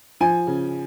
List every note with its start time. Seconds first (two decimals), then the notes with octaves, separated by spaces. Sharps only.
0.20 F3 G#5
0.47 C#3